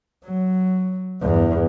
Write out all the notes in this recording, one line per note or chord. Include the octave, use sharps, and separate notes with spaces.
F#3
E2 G2